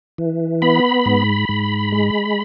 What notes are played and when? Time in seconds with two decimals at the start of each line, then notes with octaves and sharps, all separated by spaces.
0.18 E3
0.62 B3 B5
1.06 G#2
1.49 G#2
1.92 G#3